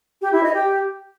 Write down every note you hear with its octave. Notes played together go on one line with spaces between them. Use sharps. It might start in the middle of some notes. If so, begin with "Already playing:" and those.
G4
E4
D#5
G4